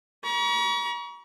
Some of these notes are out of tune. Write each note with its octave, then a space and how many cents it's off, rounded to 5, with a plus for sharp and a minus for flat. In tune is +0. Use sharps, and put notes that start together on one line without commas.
A#5 +45 C#6 +35